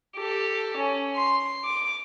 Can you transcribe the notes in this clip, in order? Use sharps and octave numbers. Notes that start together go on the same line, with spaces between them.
G4 A4
C#4
C6
D6